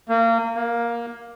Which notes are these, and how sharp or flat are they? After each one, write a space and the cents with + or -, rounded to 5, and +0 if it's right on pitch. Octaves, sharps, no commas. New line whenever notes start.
A#3 -30
A#3 +10